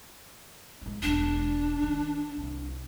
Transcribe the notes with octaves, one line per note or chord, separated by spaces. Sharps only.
F#3 G#3
E1 G#3 D4
D#3
C2